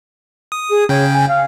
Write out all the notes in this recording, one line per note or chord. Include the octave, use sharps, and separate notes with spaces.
D#6
G#4
C#3 C#5 G5
G#5
F5